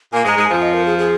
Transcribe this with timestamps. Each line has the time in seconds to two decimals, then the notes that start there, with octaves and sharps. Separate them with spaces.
0.13 A#2 A#3 G#5
0.25 G#2 G#3
0.29 A#5
0.37 G#2 G#3
0.46 F2 F3 G#5
0.62 D#5
0.74 A#4
0.86 G#4
0.98 G#4